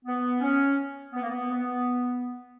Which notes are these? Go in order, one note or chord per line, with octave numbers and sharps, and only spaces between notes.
B3
C#4
B3
A#3
B3
B3